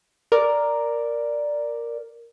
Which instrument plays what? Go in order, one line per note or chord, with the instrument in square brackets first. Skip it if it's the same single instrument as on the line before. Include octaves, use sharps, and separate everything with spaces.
[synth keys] A#4 D5